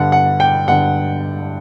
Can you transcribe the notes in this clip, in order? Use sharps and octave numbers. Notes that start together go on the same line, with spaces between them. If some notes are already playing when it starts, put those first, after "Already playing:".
Already playing: G2 D3 F#5
F#5
G5
G2 D3 F#5